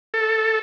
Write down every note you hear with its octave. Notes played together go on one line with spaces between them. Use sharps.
A4